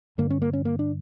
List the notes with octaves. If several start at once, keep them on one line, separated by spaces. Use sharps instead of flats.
G2 D3 A#3
C#4
A#3
C#4
A#3
D4